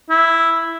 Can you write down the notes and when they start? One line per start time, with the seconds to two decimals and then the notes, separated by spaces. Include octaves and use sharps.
0.10 E4